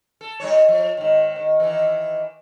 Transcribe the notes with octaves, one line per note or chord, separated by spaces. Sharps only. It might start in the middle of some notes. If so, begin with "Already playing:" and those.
A4
G3 D#4 C#5
F3
G#2 D#3
D#3
D#3 E3